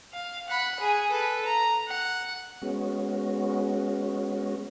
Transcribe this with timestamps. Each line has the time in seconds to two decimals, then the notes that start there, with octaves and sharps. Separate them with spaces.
0.13 F5
0.48 F#5 B5
0.80 G#4 G#5
1.10 A4 B4
1.46 A#5
1.87 F#5
2.62 G#3 B3 C#4 F#4